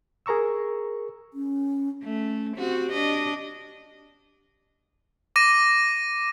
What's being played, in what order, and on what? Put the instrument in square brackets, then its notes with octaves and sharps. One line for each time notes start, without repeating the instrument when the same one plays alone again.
[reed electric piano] G#4 A#4 A#5 C#6 E6
[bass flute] C#4
[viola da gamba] A3 [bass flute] C#4
[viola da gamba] C4 F#4 [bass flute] G4
[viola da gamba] D4 D#5
[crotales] D6 A#6 D#7